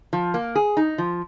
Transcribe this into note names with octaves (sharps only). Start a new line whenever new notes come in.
F3
A#3
G#4
D#4
F3